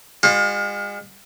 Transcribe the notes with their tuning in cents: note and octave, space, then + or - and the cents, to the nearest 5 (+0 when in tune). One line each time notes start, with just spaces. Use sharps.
G#3 -40 F4 +35